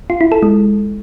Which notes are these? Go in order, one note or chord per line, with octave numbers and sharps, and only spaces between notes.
F4
E4
A4
G#3